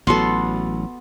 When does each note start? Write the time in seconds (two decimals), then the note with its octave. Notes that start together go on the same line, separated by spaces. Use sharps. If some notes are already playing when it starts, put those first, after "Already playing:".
0.07 A1 F#3 B3 F#4 A4 C6